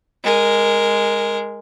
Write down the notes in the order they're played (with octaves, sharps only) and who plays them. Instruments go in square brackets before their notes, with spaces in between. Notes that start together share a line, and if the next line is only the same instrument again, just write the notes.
[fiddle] G#3 A#4